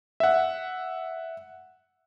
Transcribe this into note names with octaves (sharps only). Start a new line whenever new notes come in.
E5 F#5